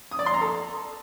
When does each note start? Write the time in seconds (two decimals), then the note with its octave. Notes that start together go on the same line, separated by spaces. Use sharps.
0.11 D#6
0.19 D5
0.26 C6
0.34 A#5
0.41 A4